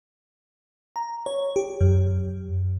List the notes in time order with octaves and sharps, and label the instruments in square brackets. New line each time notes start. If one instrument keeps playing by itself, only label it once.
[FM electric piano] A#5
C#5
G4
F#2